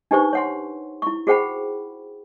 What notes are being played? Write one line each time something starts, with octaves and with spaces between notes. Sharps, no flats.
D4 D#4 G4 B4 C5 C#6
C#5 F#5 C6
E4 C#6
F#4 G#4 C5 F#5 G5 B5